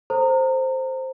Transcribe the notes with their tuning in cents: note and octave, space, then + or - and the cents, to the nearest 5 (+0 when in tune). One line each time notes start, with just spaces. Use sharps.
A4 +0 C5 +0 A#5 -30